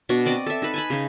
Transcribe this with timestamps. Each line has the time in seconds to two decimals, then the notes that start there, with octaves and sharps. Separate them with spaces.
0.09 B2 D4 C#6
0.26 C4 D5 D#5
0.46 A4 E5
0.62 D#4 A4 B4
0.74 G#5 A5 B5
0.90 C#3 D#4